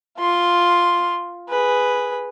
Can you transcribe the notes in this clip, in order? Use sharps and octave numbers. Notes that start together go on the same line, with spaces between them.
F4 C6
G#4 B4